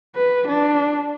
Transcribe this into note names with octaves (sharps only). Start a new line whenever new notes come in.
B4
D4